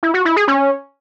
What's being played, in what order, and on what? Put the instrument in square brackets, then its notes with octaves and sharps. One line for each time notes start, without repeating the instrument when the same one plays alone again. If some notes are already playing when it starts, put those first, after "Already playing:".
[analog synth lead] E4
F#4
E4
G#4
C#4